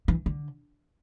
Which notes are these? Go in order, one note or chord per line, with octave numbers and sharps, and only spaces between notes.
E3
D3